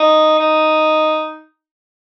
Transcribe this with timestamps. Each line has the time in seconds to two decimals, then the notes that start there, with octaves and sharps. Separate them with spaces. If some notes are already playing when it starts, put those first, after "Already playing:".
Already playing: D#4
0.39 D#4